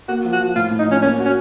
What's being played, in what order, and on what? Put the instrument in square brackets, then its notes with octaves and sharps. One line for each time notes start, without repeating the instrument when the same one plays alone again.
[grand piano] A#3 [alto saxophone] F#4
[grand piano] F3
[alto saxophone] F#4
[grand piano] F3
[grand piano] A2 [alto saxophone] F4
[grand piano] A2
[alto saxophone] D#4
[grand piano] F3 [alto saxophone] C#4
[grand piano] A#3 [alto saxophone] C#4
[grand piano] F#4
[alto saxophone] C#4